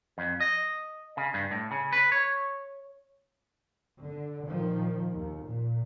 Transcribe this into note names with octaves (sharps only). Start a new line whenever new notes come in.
F2
D#5
C#3
G2
A2
C#3
B4
C#5
D3
A#2 D#3 F3
D#2
A#2